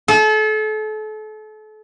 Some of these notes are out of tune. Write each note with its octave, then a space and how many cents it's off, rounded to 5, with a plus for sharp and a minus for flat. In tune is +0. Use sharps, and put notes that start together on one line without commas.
A4 -35